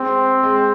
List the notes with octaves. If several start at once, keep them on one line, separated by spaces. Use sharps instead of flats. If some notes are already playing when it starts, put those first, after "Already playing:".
Already playing: G#3 C4
G#3